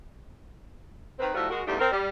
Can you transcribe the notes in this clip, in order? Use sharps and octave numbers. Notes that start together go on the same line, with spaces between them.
D#3 C4 B4
A2 D#3 F3 G3 F#4 E5
G#3 F#4 A#4
E2 G2 A3 D4 D#4 G4
C4 A#4 C5
G3